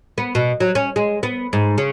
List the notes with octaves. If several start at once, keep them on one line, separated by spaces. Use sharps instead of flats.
B3
B2
F#3
C#4
G#3
B3
G#2
C#3